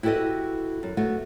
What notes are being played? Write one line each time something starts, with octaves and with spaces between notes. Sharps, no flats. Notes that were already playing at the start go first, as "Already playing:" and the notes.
E4 F#4 G4 A4 B4 D#5
F#2
A3 B3 F#4